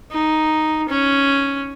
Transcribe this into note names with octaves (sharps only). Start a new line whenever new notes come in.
D#4
C#4